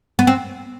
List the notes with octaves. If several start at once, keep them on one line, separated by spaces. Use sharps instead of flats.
B3
C4